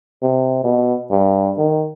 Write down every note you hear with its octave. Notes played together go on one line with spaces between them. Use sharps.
C3
B2
G2
D#3